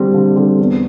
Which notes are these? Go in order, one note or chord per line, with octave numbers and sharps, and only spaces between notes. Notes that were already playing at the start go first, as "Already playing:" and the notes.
Already playing: D3 G3 C4
D3
G3 C4
E2